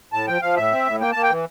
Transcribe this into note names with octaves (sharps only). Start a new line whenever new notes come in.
A2 A5
F3 G5
F3 F5
A2 E5
C4
A2
A#3 G5
A#3 A5
G5
E3